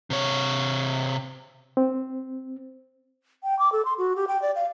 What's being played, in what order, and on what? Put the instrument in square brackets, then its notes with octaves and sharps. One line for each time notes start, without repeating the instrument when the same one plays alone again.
[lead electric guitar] C3 C#5
[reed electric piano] C4
[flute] G5
D6
A4
C6
F#4
G4
G5
D5
F5